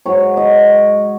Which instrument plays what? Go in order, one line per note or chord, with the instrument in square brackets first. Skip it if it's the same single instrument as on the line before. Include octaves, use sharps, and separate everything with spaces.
[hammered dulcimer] G#2 F#3 C#5
D#5